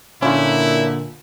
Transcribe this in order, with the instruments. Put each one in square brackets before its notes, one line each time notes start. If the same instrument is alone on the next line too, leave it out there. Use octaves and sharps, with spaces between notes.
[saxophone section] A#2 D3 [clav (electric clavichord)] C#4 F4 [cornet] E4